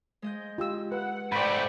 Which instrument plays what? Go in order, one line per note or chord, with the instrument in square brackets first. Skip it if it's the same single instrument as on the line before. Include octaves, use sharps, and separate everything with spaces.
[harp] G#3 D#5 G6
[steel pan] F4 G4 E6
[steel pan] B4 [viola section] F#5
[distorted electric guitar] G#2 A3 [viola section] C5 D5 G5 [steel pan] B5 C#6